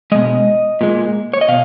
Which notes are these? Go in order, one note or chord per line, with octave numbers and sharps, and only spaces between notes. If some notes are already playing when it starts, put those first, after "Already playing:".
B2 G#3 D#5
A#2 G#3
C#5
D#5
B2 F5